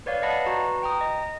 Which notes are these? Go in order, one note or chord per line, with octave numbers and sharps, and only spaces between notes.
B4 C#5 D5 F5
B4 D5 D#5 F#5 A5 B5
F#4 B4 A#5
G5 A#5 D#6
D#5